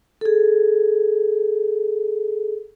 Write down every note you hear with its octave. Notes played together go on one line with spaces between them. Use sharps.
G#4 A4